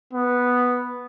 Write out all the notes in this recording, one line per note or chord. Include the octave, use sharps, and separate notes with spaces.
B3